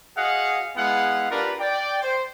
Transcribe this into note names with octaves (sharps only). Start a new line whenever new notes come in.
F#4 G#4 D#5 F5 F#5
G#3 B3 E4 F5 F#5
D4 F4 G4 A#4 B4 D5
D5 G5
C5